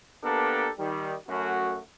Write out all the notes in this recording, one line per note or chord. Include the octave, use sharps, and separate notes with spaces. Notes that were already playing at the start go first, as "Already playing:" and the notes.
A#3 B3 D4 G4 A4 A#4
D#3 G3
F#2 A3 F#4